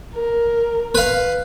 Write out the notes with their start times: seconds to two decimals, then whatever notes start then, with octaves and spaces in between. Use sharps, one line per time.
0.13 A#4
0.95 B4 F5